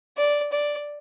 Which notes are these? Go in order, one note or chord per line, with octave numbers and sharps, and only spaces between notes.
D5
D5